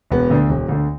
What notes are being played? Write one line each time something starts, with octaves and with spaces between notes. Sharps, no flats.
E1 B3
D2 D3
E1
D2 D3